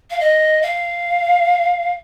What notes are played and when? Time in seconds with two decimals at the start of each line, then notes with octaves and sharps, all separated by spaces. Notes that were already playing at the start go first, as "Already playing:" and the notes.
0.11 F5
0.20 D#5
0.62 F5